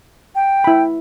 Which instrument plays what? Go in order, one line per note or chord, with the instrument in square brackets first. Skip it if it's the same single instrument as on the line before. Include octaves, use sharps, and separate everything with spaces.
[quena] G5
[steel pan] E4 B5